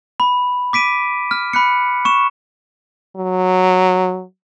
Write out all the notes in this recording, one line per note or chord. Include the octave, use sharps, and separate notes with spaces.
B5
D6 B6 D7 D#7
F6
B5 F#6 C#7
C#6 E7
F#3